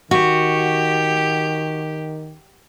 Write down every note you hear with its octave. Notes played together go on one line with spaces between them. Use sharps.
D#3 F#4 G4